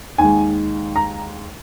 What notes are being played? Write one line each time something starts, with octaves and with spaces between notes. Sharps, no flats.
D#2 D#3 G#3 G#5
A#5